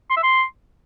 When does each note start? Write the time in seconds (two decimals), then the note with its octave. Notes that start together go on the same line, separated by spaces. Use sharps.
0.10 C6
0.17 E5
0.23 C6